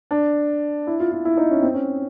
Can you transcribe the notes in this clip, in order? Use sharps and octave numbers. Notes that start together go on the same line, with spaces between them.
D4
E4
F4
F4
E4
D#4
C#4
C4
C#4